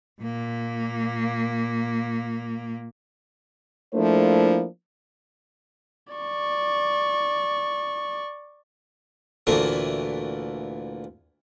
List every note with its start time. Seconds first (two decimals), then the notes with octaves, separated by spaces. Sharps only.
0.22 A#2 A#3
3.94 F3 A3 A#3 D4 E4 C5
6.13 D5 C#6
9.47 D2 A#2 E3 A3